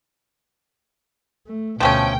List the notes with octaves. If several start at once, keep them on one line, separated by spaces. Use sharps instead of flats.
A3
D2 B2 F3 A3 C#4 G5